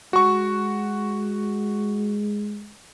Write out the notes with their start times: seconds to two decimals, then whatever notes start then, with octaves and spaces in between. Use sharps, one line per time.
0.13 G#3 F#4 C#6